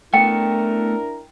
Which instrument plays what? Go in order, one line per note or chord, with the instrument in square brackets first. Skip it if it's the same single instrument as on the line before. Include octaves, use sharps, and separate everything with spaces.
[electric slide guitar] A3 B3 [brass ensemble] D4 E4 A#4 [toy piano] G5